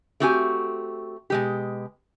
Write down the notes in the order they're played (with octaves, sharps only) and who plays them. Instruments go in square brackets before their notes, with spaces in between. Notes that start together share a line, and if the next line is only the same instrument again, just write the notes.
[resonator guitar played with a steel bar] A3 C4 F#4 G4 G#5
B2 G#3 G4